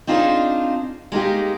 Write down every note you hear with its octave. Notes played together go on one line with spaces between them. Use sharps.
C4 D4 D#4 F4 G#4 C5
G#3 A#3 D#4 G4